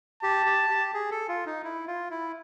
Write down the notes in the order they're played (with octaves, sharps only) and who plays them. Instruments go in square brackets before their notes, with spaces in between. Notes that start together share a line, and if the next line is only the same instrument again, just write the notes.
[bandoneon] G4 [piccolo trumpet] A5
[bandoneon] G4
G4
G#4
A4
F4
D#4
E4
F4
E4